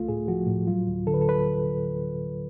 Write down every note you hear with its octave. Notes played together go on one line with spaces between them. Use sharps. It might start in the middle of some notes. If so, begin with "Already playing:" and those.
Already playing: C#2 A3 F4
A2 G#4
F3 F#4
A2
F#3 F4
D2
D3 A4
B4
A4
B4